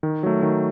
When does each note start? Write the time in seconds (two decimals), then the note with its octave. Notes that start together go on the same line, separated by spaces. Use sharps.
0.03 D#3
0.23 F#3 A3
0.43 D#3